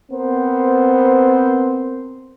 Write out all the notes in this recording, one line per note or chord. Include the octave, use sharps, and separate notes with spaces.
B3 C4 A#4 C5